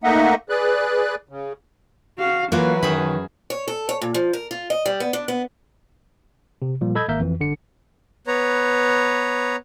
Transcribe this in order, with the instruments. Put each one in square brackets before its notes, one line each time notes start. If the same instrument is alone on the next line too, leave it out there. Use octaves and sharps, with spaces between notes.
[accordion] A3 A#3 D#4 D#5 E5 F#5
G#4 B4 D5 F#6
C#3
[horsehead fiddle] F#4 F5
[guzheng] E3 F#4 [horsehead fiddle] F#3 B4 [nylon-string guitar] A#3 F4
[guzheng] F#2 G#4 B5 [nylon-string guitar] D#3
[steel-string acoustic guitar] C#5
A4
C#5
A#2
F3
A#4
F4
D#5
G3
B3
D4
B3
[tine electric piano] C3
A#2 F3 G3
A4 D#5 B5 E6 G6 G#6
G#1 A#3 A#4 E5 G6
F2 E3
G1 D3 C#7
[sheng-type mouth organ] B3 B4 C#5 A#5